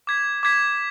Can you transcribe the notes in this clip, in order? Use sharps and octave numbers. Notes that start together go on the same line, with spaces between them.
D6 G#6 B6
D6 G#6 B6